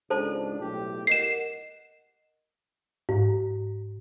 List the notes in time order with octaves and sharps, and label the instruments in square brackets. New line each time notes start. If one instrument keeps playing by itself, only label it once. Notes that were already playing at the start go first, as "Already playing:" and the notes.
[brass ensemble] C#2 G#2 D4 [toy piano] A4 C5 A5
[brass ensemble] B1 A2 G4
[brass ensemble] A#4 D#5 F#5 [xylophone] C7 E7
[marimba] G#2